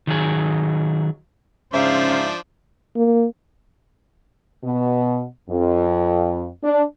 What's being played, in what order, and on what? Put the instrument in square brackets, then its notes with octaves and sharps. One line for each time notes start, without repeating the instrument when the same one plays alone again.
[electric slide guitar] D#3 F#3 G#4
[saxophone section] G#2 E5 [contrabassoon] C#3 [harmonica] F3 D4 D5 [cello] C5 F5
[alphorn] A#3
[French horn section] B2
F2
D4